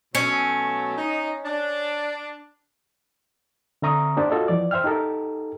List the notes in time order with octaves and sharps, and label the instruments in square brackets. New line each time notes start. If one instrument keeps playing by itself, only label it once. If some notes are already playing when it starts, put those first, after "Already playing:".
[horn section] B2 F#3 A3 [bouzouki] C#4
[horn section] D#4
D4
[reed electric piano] D3 C4 E5 A#5 C#6 D#6
A#3 D4 G4 A#4 C5 A5
F4 F#4 A4 C#5 D#5
E3 F3 D5
C5 E5 G5 F6
D#4 G4 A4 A#4